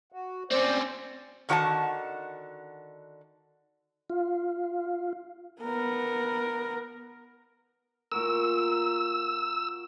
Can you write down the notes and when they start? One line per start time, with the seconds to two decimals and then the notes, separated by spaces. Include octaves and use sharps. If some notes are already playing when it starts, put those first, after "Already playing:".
0.12 F#4
0.51 C4 C#4 C5 D5
1.49 D3 D#3 F#4 D5 F#5 A5
4.10 F4
5.62 B3 A#4
8.12 A#2 F#4 A#4 E6